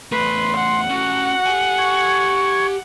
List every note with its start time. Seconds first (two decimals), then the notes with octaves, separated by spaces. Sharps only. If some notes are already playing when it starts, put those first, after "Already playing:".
0.12 E2 A3 B4 C6
0.57 F#5
0.89 A3 C#4 F#4
1.46 G4 G#5
1.78 C#6 G#6